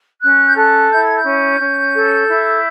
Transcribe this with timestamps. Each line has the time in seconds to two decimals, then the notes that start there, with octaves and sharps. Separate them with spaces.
0.21 C#4 F#6
0.45 G6
0.55 A4 F#6
0.89 E4 G6
1.02 G#6
1.14 G6
1.24 C#4
1.59 C#4
1.94 A4
2.28 E4